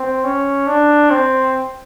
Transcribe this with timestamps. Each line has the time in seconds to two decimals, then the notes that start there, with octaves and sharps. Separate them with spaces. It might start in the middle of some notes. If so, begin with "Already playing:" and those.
Already playing: C4
0.24 C#4
0.67 D4
1.10 C4